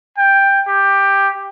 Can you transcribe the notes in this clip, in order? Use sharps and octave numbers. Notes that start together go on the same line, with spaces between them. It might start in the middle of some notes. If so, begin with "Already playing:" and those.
G5
G4